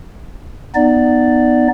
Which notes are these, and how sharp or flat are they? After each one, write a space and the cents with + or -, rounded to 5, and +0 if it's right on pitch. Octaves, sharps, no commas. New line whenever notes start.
B3 +0 D#4 -25 D5 +0